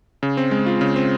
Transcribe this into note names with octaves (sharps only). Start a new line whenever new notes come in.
C#3
C4
G#3
F4
C#3
C4